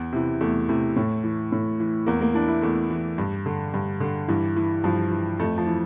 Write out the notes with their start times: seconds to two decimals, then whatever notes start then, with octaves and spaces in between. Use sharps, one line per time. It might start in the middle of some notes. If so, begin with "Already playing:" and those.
Already playing: E2
0.13 C3 E3
0.41 E2 A3
0.69 C3 E3 A3
0.96 A2
1.24 E3
1.52 A2
1.80 E3
2.06 E2 A#3
2.21 A#3
2.34 E3 D4
2.48 E4
2.62 E2 A3
2.90 E3
3.18 G2
3.46 D3
3.74 G2
4.00 D3
4.28 G2 E3
4.56 E3
4.84 G2 F3
5.11 E3
5.39 F2 A3
5.58 F3
5.67 E3